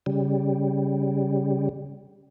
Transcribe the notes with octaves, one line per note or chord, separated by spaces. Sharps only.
C#3 G3